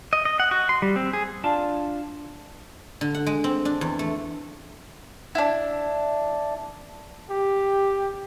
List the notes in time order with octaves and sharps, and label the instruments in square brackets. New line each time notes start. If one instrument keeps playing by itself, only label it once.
[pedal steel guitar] D#5
D#5
F#5
F#4
C6
G3
C4
G#4
[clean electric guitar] D4 F4 A5
[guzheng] D3
F#5
G#3
C4
D4
E2
A3
[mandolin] D4 E4
[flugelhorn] G4